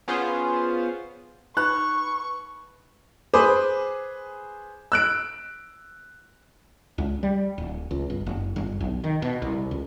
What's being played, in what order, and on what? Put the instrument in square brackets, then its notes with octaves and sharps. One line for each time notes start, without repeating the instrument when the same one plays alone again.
[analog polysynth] B3 C#4 F4 G#4 C5
[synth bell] D#4 B4 B5 [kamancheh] C#6 [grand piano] F#6
[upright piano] G#4 B4 C5 B5 D6 D#6
E6 F#6 D7
[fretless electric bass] C#2
G3
D1
C#2
G1
F#1
G1
B1
D#3
B2
C2
C#2